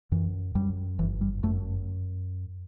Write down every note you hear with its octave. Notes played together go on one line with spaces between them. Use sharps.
F#2 E3
F#2 G3
G1 E3
G3
F#2 A3